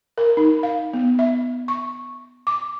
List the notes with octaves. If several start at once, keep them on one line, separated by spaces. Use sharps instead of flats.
A#4
D#4
F5
B3
E5
C#6
D6